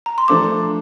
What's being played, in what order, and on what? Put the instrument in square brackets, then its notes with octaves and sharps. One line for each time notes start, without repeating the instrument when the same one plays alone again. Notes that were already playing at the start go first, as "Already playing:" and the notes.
[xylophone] A#5
C6
[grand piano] F3 A3 D4 A4 C5 [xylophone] D6